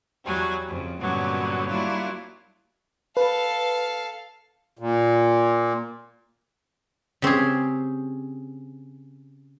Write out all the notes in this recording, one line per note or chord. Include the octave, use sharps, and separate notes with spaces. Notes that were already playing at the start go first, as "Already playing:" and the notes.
E2 F#3 G3 G#5
F2 C#3
G2 A#2 D3 F#3 B3 C#4
F#3 G3 A#3 D4 E4 F4
A4 B4 F5
A#2
C#3 C4 G4 G#4